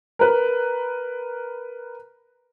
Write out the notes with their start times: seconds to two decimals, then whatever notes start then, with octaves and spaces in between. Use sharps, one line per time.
0.19 A#4 B4